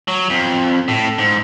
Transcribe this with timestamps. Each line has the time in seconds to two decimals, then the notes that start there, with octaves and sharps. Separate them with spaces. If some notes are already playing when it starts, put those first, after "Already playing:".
0.08 F#3
0.30 F2
0.88 A2
1.18 G#2